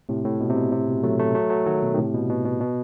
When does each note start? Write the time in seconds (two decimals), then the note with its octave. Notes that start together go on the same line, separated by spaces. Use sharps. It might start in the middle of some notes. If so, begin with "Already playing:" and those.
0.09 A2 C3
0.25 A2
0.40 B2
0.50 C3
0.56 B2
0.72 A2 C3
0.88 B2
1.03 F#3 A3
1.19 F#3 A3
1.35 F#3 A3
1.50 F#3 A3
1.66 D#3 F#3
1.82 B2
1.94 D#3
1.97 A2 C3
2.14 B2
2.30 B2
2.45 B2
2.60 B2